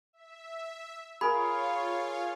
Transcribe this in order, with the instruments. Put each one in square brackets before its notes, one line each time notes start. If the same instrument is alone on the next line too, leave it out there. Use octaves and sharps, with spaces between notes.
[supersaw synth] E5
[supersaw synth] F4 C#5 F5 [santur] G#4 A#4 [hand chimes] B5